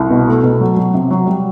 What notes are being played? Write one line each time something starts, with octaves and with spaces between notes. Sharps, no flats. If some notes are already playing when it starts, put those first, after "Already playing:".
Already playing: C2
B2
A3
B2
F#3
F#3
C3
F#3
G3